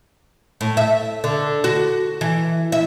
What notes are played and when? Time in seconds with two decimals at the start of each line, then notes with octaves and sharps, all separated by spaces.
0.61 A2
0.77 E5
1.24 D3
1.64 F#4
2.21 E3
2.72 E5